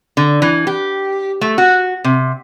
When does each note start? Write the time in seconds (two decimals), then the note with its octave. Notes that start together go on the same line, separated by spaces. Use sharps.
0.17 D3
0.42 E3
0.67 G4
1.41 A3
1.58 F#4
2.04 C3